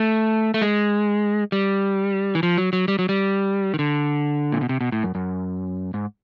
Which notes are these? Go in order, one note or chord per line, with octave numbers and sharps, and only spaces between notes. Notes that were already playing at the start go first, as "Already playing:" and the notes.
Already playing: A3
A3
G#3
G3
E3
F3
F#3
F#3
G3
F#3
G3
D#3
D3
A#2
B2
C3
B2
A2
F#2
F#2
G#2